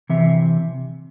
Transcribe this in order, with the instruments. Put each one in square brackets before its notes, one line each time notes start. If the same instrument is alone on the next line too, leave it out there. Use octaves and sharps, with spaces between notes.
[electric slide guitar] C3 E3 E5